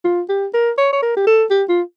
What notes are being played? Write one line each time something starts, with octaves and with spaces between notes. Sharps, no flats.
F4
G4
A#4
C#5
C#5
A#4
G4
A4
G4
F4